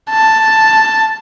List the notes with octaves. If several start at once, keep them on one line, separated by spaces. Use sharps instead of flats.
A5